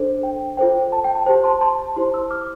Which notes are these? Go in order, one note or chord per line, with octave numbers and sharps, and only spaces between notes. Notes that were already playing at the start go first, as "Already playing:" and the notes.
Already playing: D4 A4 C5
G5
F4 A4 C5 G5
A5
G5
A5
G4 C5 A5
A5 C6
A5 C6
E4 G4 C5 A5 C6
C6 E6
D6 F6